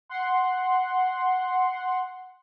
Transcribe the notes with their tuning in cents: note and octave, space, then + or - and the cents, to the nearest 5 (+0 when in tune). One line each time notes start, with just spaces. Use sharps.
F#5 +0 C6 +0